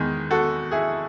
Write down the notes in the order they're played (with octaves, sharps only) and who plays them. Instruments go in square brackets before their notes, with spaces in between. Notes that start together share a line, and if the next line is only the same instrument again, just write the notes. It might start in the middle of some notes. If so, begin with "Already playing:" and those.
Already playing: [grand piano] E2 D#3 G#3
F#4 A4
E4 G#4